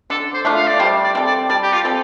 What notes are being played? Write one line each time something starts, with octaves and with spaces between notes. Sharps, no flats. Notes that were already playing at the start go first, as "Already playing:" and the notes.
D3 A4
C5
A3 D4 F4
F5
D5
G3 C5
D5
C4 A4
D5
G3 D5
G4
F4
C4 A4